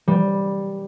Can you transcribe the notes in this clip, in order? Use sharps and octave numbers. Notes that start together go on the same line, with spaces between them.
G3